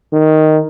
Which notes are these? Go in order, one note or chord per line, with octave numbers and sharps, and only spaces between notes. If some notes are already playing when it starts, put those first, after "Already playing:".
D#3